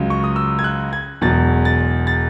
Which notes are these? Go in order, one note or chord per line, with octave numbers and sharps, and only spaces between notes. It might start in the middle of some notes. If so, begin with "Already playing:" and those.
Already playing: C#2 C#3 F#3
C#6
D#6
E6
G#6
F#6
G#6
E1 E2 B2 F#3 A6
A6
A6